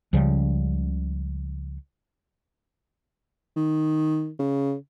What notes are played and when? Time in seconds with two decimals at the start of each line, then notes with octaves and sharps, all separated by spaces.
0.13 C#2 C#3 F3 G3
3.56 D#3
4.39 C#3